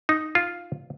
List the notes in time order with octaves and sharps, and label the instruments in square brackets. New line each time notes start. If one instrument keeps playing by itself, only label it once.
[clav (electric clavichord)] D#4
F4